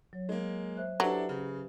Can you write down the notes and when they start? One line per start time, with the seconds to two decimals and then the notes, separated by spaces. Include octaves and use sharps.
0.13 F#3 C#5
0.29 G#3 A#3
0.77 C5 E5 F#6
1.00 F#3 D4 E4 G4 A4 B4 C5
1.29 C#3